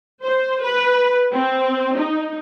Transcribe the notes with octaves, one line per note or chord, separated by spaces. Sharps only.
C5
B4
C4
D#4